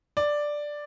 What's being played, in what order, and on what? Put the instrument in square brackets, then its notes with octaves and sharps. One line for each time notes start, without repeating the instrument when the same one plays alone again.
[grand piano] D5